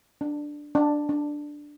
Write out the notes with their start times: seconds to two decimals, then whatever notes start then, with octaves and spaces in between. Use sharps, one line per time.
0.21 D4
0.75 D4
1.09 D4